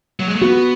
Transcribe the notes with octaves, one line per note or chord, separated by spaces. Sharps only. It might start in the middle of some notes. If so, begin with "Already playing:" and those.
F#3
G#3
A3
B3 F#4